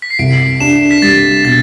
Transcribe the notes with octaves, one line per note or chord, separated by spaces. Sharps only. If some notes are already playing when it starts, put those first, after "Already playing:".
B6
C7
C2 D7
D4 E7
B6
G3 A6
B2 A6